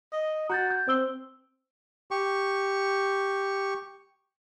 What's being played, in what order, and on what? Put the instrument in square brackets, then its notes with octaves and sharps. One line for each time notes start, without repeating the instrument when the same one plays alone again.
[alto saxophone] D#5
[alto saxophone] F#4 [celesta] A#5 G6 A6
[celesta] G6
[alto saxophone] C4 [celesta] C5 E6 G7
[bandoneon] G4 C#6